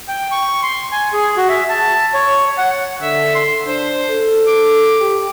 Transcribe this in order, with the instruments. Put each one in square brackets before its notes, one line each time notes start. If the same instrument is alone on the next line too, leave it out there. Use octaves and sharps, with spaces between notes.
[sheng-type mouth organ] G5
C#6
C6
G#5
G#4
F#4
E5
A5
C#5
F#5
[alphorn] D3 [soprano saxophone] E5
[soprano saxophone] C6
[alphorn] D4 [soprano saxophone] C5
[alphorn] A4
[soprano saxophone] D6
[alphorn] G4